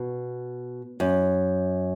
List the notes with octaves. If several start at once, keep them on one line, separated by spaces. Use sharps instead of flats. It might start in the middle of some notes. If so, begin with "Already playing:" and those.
Already playing: B2
F#2